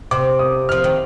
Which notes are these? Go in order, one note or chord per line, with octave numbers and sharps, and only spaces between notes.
C3 D6
D#6
F3 F6
D#3